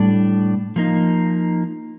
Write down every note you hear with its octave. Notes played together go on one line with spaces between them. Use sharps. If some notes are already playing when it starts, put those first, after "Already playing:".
Already playing: A2 G3 D4 A4 D5
F3 A#3 D#4